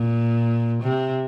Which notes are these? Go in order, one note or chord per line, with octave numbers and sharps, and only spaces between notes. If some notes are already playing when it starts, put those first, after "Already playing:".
Already playing: A#2
C3